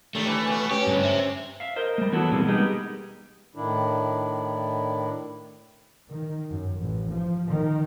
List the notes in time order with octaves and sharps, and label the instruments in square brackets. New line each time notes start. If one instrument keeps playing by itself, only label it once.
[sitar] D#3 G3 D4 [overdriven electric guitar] A3
[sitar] E3
B2 B3
[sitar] C#4 [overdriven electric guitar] G4
[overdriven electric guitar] G2 D3
C5 E5
[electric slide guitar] E5 F5
A#4 C5 D#5
G3 A3
E3 F#3 B3 F#4 A4
B2 G3 G#3 A#3 C4
G3 G#3 B3 D#4 G4
[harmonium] A2 D#3 D4 E4
[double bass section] D#3
F#2
A1
F3
D#3